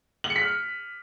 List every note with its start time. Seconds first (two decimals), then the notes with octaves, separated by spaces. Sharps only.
0.24 F#7
0.30 C#7
0.36 B6
0.42 F6